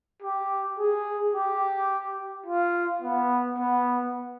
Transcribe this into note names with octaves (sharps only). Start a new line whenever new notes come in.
G4
G#4
G4
F4
B3
B3